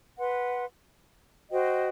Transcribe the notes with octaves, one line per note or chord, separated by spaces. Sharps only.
B4 F#5 C6
F#4 C5 D#5 G5